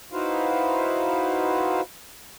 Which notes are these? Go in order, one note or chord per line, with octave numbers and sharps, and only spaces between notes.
D#4 E4 F#4 B4 C5 F5